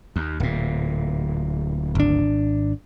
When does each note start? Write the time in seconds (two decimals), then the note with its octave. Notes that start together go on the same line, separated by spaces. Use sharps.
0.16 D#2
0.40 D1 A#2
1.95 G#1 D4